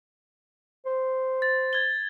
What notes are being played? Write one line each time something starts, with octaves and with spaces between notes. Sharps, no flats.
C5
A6
G#6 G7